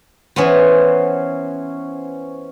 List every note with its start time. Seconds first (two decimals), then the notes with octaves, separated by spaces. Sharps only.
0.36 E3 B3 C#4 C5